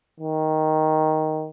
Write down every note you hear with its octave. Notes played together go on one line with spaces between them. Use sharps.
D#3